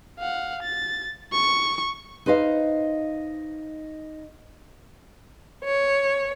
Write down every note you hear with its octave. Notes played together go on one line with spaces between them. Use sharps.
F5 F#5
A6
C#6
D#4 B4 C5 D#5 F5
C#5